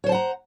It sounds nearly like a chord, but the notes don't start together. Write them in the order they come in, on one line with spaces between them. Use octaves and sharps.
C#5 C5 A5 F#5 A#5